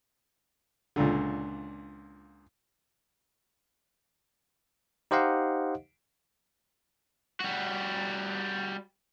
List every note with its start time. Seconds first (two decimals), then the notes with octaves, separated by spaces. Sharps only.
0.96 C#2 A#2 D3
5.11 D#4 G4 C5 D#5 F5 F#5
7.40 G3 F#4